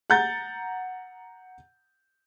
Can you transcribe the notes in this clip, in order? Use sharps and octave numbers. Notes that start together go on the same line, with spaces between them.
F#5 A#5 G6 A6